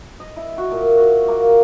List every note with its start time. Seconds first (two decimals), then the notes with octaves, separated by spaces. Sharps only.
0.20 D#5
0.36 E4
0.58 F#4
0.71 A#2
0.97 F#4
1.28 A#3